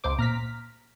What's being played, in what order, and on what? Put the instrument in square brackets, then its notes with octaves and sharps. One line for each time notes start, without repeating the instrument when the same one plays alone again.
[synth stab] C#2 C5 D6
[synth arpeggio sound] A#2 [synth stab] A#5 F6 B6